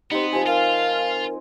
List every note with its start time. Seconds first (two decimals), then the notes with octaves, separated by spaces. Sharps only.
0.11 B3 C4 D#4 G4
0.33 F3 G4 G#5
0.46 F4 A#4 F5